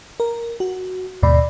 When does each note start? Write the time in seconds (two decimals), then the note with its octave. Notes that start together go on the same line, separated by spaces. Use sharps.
0.20 A#4
0.60 F#4
1.23 D#2 G#2 B2 D5 B5